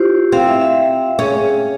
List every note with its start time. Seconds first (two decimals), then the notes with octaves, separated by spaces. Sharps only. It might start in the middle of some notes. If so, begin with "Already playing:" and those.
Already playing: E4 F4 G4 C5
0.32 C4 F5
0.48 E5
0.61 E5
1.19 C#4 G#4